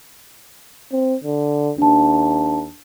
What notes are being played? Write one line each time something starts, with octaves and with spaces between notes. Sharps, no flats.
C4
D3
D#2 D4 A5